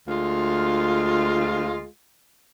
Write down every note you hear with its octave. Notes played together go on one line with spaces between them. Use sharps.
D2 G#3 F4